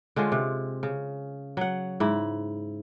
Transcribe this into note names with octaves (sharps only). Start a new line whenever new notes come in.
D3 G#3 C#4 F4
C3
C#3
F#3 F#5
G#2 E4